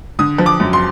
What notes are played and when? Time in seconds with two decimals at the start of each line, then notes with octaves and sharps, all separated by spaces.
0.19 D3 D#6
0.38 F3
0.46 D6
0.60 F#2
0.73 C6